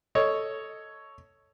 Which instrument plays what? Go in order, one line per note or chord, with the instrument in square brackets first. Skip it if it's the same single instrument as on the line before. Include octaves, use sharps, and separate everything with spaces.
[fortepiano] A4 C#5 D#5